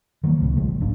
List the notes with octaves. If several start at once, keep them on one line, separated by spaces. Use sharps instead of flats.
D#3 E3 F#3 A#3
C#2 A2 C3
B1 A2 F3 G#3
A1
F1 G#2 D4